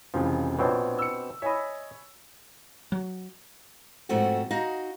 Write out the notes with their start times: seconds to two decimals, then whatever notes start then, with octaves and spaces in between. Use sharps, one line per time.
0.14 F1 C#3 E3 F3
0.59 A#1 B2 C4 D4 C#5
0.98 E6 C#7
1.42 C#5 D#5 E5 G#5 B5
2.92 F#3
4.09 G#2 B2 F3 A3 C4 F#4
4.50 D#4 F#4 D#5 F5